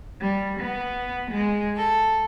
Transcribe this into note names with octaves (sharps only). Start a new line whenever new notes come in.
G3
B3
G#3
A4